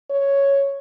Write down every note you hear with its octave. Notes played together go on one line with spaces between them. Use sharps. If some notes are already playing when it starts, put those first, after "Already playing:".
C#5